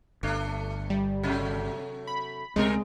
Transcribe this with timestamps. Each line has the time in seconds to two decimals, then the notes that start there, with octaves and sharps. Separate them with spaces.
0.23 G1 A3 D4
0.90 G3
1.23 C3 F#3 A3
2.07 B5
2.56 C#2 B2 G#3 A3 C4 F#4 A#4